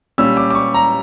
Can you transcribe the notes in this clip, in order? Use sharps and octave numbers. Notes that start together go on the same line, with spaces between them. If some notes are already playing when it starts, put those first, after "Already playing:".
A#2 G3 C#4 E6
D6
D6
C#6
A#5